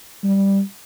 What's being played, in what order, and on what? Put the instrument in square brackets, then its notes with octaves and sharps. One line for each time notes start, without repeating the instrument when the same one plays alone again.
[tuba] G3